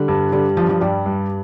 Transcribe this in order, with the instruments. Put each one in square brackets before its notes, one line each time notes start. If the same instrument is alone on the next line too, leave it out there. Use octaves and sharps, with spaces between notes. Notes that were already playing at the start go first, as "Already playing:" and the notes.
Already playing: [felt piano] D3 [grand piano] G3
[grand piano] G2
[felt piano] D3 [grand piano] G3
[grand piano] G2 [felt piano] F3
[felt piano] F3
[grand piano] G2 [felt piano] G3
[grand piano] G2